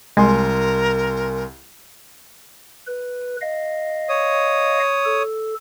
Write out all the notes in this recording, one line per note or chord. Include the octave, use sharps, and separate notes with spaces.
C2 G#3 A#4 G#5 C6
B4
D#5 F5
C#5 D#6
A4